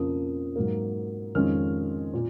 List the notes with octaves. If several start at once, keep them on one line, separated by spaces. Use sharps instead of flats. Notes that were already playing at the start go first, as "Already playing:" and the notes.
Already playing: F2 C#3 F3 A#3 D#6
G#2 F#3 A#3
F2 D#3 G#3 C#4 F4 F6
A#2